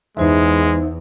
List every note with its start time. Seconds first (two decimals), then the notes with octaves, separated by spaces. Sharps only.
0.17 E2 G#3 D#4 C5 E5